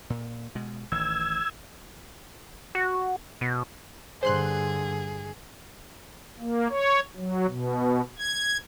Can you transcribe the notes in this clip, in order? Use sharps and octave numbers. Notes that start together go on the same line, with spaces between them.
A#2
B2 G#3
A1 D#3 E6 G#6
F#4
B2
G2 D3 G#4 C5 C6 F#6
A#3
C#5
F#3
B2
G#6